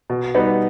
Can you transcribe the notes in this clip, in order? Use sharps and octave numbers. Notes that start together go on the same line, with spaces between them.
B2
G3 B3 D#4